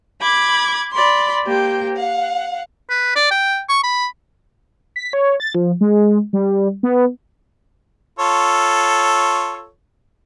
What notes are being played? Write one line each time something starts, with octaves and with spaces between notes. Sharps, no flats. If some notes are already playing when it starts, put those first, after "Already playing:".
B5 D6 G#6
D5 B5 C6
A#3 G4 C5 G5
F5 F#5
B4
D5
G5
C#6
B5
B6
C#5
A6
F3
G#3
G3
B3
F4 A4 C#5